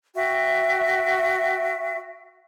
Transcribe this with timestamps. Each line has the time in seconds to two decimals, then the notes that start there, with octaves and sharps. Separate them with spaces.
0.15 F#4 E5 G5